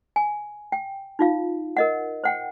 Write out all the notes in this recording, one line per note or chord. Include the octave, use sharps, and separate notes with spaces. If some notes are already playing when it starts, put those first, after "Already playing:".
G#5
G5
D#4 F4 F5
A#4 D#5 F#5
C5 F#5 G5